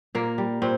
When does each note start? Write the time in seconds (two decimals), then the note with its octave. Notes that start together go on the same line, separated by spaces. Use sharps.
0.15 A#2 A#3
0.38 G3
0.62 A#2 C4